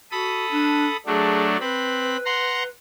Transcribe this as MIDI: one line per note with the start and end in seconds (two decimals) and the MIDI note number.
0.11 0.45 66
0.11 0.97 69
0.11 0.97 83
0.11 0.97 87
0.50 0.86 62
1.06 1.57 54
1.06 1.57 57
1.06 1.57 62
1.06 1.45 68
1.60 2.17 60
1.60 2.68 71
1.60 2.17 83
2.25 2.63 78
2.25 2.63 82
2.25 2.63 84